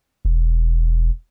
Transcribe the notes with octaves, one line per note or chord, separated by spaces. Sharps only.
E1